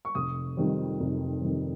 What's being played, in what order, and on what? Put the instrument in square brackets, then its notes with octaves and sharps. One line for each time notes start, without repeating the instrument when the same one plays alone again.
[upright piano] C#6
F1 D#6
F2 D#3 G3
F1
F2 D#3 G3